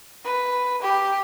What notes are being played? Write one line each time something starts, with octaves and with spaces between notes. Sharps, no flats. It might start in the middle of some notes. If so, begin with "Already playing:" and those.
B4
G4